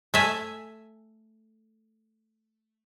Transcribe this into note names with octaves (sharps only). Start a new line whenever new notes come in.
A3 E5 G#5